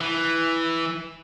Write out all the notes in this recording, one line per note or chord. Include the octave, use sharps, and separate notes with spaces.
E3